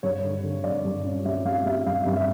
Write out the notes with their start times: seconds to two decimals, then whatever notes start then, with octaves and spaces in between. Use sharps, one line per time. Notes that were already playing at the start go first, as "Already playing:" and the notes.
0.03 G2 C#5
0.24 D3
0.44 D3
0.64 G2 D5
0.85 G2
1.05 C#4
1.25 G3 E5
1.45 G3 F5
1.66 G3 E5
1.86 G2 F5
2.06 G2
2.16 E5